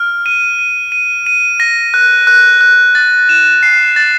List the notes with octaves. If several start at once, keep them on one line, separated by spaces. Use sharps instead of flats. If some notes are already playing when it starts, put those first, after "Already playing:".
Already playing: F6
D#7
D#7
D#7
D#7
A#6
F#6
F#6
F#6
A6
E7
C7
A6